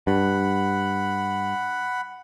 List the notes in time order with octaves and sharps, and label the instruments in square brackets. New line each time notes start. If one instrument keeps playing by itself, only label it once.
[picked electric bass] G2 [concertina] F#5 B5